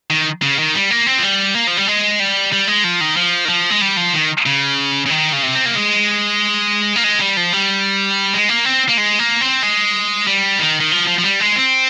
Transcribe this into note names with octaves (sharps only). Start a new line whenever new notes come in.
D#3
C#3
D#3
G3
A#3
C4
F3
G3
A#3
F3
G3
G#3
G3
G3
G#3
F3
D#3
F3
D#3
F3
G#3
G3
F3
D#3
C#3
C#3
D#3
C#3
C3
C4
A#3
G#3
A#3
G#3
G3
F3
G3
G#3
A#3
C4
A#3
G#3
A#3
C4
G#3
G3
D#3
D#3
F3
F3
F3
G3
G#3
C4